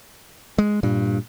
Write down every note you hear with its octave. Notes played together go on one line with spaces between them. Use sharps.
G#3
G2 A#2